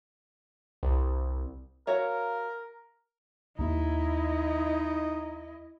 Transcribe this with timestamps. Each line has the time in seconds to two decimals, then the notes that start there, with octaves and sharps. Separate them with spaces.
0.83 C2
1.87 F#4 A#4 C#5 E5 F5 A#5
3.59 D#2 A#3 D#4 E4 D#5